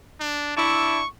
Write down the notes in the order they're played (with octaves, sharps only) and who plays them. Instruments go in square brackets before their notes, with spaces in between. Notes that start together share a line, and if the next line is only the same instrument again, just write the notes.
[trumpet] D4
[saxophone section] D4 E4 [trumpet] C#6